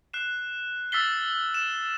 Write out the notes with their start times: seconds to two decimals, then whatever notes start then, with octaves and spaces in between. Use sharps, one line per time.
0.14 F#6 C7 E7
0.92 E6 F6 A6 B6 C7 G7
1.54 E7